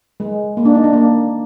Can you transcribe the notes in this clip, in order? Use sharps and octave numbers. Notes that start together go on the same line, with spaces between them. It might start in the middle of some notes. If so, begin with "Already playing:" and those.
G#3
A#3
D4
D#4
D4
A#3